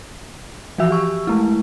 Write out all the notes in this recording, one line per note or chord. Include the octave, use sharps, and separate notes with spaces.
E3 F3 F#4 E5 E6
G4 C#6 E6
G#3 A3 E4